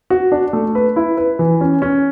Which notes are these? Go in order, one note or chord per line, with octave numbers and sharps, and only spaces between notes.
F#4
D4
A3
B4
E4
B4
E3
C#4
C#4